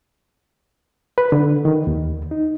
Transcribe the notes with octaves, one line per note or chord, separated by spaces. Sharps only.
B4
D3
D#3
D#2
D#4